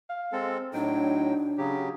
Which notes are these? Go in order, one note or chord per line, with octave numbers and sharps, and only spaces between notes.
F5
G#3 C4 A4
A2 F#3 D4 D#4 G5
C#3 F#3 G4